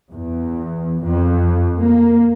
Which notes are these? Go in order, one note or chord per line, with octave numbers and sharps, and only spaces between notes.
E2
F2
A#3